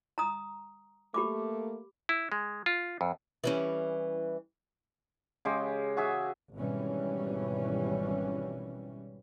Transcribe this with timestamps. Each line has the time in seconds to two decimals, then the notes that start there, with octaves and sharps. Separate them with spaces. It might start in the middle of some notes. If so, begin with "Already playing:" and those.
0.18 A#5 D#6
1.14 A3 A#3 G4 B5 D6
2.09 E4
2.32 G#3
2.66 F4
3.01 F2
3.44 E3 G3 C#4
5.45 C#3 G#3 G4
5.97 F#4 G#4 E5
6.55 G#1 B2 E3 G3 C#4